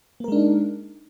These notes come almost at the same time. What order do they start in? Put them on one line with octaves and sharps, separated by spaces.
A#3 A#4 G#3 D4 D#4